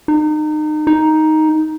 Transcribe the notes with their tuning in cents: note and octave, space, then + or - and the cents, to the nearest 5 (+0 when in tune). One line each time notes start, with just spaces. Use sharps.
D#4 -30
D#4 +5